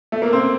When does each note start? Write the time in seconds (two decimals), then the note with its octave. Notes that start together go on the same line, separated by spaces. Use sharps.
0.12 A3
0.22 A#3
0.33 C4